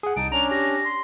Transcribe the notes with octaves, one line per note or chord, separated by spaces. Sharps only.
G#4 F#5
C2 D#4 A5 D#6 D7
C#4 D4 A#5 F7
G4 A#6
C6